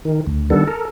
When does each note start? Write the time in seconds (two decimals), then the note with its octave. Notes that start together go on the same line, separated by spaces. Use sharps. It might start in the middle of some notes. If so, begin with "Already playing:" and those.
0.05 D#3
0.27 D2
0.50 D3 D#3 G3 B3 A4
0.68 A4 A#4